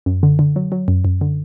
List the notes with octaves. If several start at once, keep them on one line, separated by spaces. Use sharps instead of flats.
F#2
D3
D3
F#3
F#3
F#2
F#2
D3